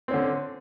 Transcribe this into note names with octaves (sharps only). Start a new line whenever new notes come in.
D3 C4 C#4